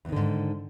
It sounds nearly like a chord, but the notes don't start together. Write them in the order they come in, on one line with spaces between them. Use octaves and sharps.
E2 D#3 D3 G#2